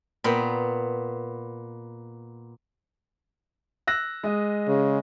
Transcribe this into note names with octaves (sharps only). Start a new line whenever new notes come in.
A#2 B3 G5
E6 F#6 A#6
G#3 D#5
C#3